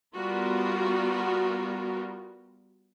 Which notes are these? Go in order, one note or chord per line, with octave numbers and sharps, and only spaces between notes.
G3 B3 F4 F#4 A#4